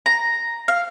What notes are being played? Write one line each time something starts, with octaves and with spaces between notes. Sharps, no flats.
A#5
F5